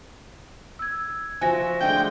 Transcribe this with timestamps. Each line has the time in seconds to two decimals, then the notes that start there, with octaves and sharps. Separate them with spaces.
0.79 E6 G#6
1.41 F3 F#4 E5 G#5 A#6
1.81 G#3 A3 D4 G5